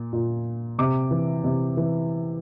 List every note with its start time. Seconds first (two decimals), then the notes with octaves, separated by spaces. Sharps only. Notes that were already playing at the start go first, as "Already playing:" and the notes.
Already playing: A#2
0.13 A#2
0.79 C3 D6
1.11 E3
1.44 C3
1.77 E3